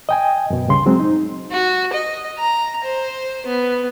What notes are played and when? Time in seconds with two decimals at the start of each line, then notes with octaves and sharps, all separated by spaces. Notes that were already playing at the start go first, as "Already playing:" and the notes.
0.09 D#5 G5 G#5
0.50 F#2 B2
0.67 C#2 G2 C#3 C6
0.86 F#3 G#3 C4
1.00 D#4
1.51 F#4
1.93 D#5
2.39 A#5
2.84 C5
3.47 B3